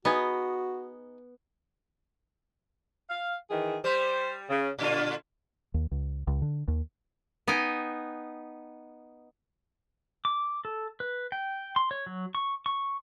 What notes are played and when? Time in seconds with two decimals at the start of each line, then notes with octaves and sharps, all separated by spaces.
0.05 B3 D#4 F#4 G#4
3.09 F5
3.49 D#3 E3 G#4
3.84 G3 G4 C5
4.49 C#3
4.79 A#2 D3 D4 F4
5.74 D#2
5.91 C#2
6.27 C#2
6.42 D3
6.68 D#2
7.47 B3 D#4 G5 G#5
10.25 D6
10.65 A4
11.00 B4
11.32 G5
11.76 C6
11.91 C#5
12.06 F#3
12.35 C#6
12.66 C#6